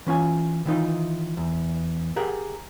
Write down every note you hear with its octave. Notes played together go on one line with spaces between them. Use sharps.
E3 C#4 F4 G#5
D#3 E3 D#4 F4
E2
G4 G#4 A#4 F#5